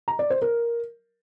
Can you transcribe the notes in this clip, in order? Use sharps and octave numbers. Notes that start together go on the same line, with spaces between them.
A#5
D5
C5
A#4